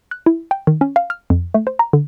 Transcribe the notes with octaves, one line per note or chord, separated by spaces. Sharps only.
F#6
E4
G5
D#3
C#4
F5
F6
F2
A3
C5
A#5
D3